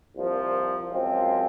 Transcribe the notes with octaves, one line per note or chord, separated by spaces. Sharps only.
C2 A#2 F3
F#2 F3 G#3 C4